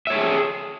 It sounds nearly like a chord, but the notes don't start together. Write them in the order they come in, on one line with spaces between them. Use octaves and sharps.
E5 C#5 A4 G#4